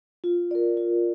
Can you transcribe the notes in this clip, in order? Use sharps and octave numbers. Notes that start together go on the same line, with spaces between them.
F4
A#4 D5
F4